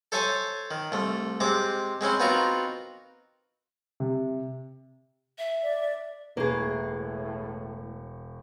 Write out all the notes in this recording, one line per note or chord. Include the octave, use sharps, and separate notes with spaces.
A4 C5 C#5 E5 G#5 A5
D#3
C2 A3
C3 G#3 C4 D6
G#3 C4 C#4 E4
B3 C4 D#4 F4 F#4 A#4
C3
E5
D5
E1 A2 A#3 E4 G#4 B4 C#6